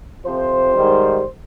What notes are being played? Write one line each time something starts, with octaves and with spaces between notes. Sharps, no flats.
F2 C3 F3 C5
G#2 D#3 G3